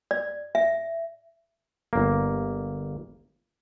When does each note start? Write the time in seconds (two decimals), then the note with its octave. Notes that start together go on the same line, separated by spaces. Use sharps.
0.11 D5
0.55 E5
1.93 G1 A#3